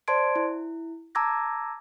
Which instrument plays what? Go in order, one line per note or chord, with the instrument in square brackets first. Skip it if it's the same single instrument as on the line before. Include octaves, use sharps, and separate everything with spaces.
[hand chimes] C5 D5 A5 C6 G#6 D7
E4
A5 A#5 D6 E6 G#6 A#6